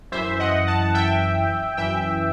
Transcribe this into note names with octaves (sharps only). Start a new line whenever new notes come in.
F#2 E3 C5 E5
D#5 F#5
F#5 A5
E5 G5
F#2 E3 E5 G5